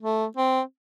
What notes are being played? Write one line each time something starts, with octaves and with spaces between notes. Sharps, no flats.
A3
C4